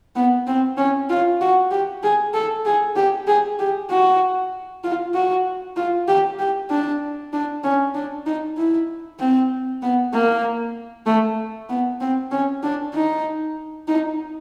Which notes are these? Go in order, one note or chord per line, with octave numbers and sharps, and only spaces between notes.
B3
C4
C#4
F4
F#4
G4
G#4
A4
G#4
G4
G#4
G4
F#4
F4
F#4
F4
G4
G4
D4
D4
C#4
D4
D#4
E4
C4
B3
A#3
A3
B3
C4
C#4
D4
D#4
D#4